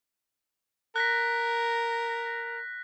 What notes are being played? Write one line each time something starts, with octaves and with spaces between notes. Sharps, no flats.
A#4 F#6 A#6 B6